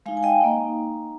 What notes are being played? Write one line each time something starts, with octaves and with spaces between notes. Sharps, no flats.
G#3 D#4 F5 G#5
G#5
D#5 G5
A#3 D#4